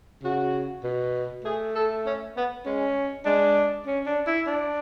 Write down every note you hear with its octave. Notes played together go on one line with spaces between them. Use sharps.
C#3 F#4
B2
A3 G#4
A4
C#4
B3
G#3 C#4
G#3 D4
C#4
D4
E4
D4